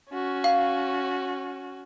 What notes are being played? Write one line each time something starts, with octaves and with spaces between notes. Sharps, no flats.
C#4 F#4
F5